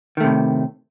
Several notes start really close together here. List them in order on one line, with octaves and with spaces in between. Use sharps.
D#3 A3 C3 A2